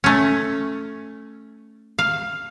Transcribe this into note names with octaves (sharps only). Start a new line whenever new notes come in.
A3 C#4
F5